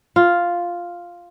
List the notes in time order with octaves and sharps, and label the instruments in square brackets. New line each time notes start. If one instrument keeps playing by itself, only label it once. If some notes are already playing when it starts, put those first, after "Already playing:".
[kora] F4